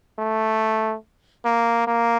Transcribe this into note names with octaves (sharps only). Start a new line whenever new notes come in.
A3
A#3
A#3